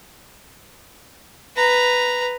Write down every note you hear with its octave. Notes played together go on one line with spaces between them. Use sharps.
B4 A#5